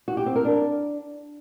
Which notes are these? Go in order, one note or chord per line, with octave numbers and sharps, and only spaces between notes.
F#4
G4
C4
A#4
D4